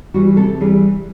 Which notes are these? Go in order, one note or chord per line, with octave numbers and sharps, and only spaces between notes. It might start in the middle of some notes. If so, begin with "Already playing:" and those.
E3 G3 F#4
C3 A4
E3 G3 G#4